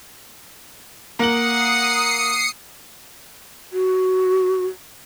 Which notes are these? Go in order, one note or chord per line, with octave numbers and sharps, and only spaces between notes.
A#3 F#5 D#6 C7 C#7 F#7
F#4